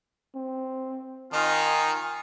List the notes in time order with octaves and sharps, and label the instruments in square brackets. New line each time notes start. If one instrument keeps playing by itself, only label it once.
[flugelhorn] C4
[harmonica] D#3 D#4 [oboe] F4 [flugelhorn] G#5